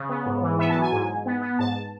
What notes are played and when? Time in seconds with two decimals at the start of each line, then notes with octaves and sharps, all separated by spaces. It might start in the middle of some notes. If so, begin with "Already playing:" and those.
Already playing: C#3
0.09 B3
0.26 G#2
0.42 E3
0.58 B3 E5
0.70 A5
0.75 F#3
0.81 G#5
0.93 G#2
1.09 G#2
1.26 B3
1.41 B3
1.59 G#2 A5